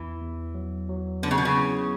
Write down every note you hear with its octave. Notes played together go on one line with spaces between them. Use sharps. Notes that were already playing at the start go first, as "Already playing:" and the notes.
Already playing: E2 E3
E2
F#3
F#3
D3 B3
C#3
B2
C#3
E4